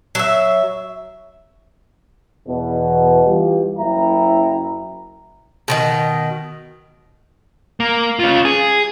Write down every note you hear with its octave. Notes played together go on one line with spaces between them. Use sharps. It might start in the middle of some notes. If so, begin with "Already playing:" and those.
F#3 E5
E2 B2
E3 G3 F4 G4
F#1 F#2 E4 G5 A#5
B2 D3 D#3
A#3
C#4 F4
G#4